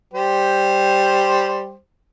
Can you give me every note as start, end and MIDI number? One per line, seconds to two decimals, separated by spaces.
0.14 1.75 55
0.14 1.75 67
0.14 1.75 72